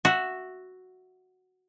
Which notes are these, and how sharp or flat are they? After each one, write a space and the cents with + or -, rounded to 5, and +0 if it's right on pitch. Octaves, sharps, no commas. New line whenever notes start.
F#4 +0 E5 +0